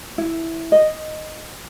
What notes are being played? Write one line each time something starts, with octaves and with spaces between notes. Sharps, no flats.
E4
D#5